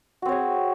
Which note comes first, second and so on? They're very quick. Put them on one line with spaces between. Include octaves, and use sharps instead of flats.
F#4 C4 C#5 G#4